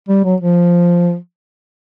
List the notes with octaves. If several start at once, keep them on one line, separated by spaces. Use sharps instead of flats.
G3
F#3
F3